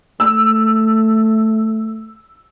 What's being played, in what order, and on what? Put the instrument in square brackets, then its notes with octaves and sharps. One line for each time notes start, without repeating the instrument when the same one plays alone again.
[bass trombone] A3 [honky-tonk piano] E6